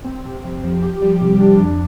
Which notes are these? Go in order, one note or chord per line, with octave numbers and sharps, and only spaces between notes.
C4
C3
F2
F3
G4
G3
C3
D4
F2